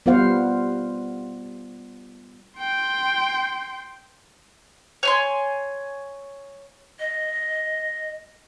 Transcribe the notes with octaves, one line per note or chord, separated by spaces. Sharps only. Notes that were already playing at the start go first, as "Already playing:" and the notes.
G3 B3 F4 C5 F5 F#5
G5 C6
C#5 G#5 C6
D#5